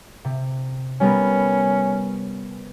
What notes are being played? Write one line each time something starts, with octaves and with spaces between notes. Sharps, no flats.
C3
G3 B3 C#4 A#4